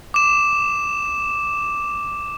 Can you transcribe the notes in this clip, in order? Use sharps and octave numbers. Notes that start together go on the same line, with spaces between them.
D6 E7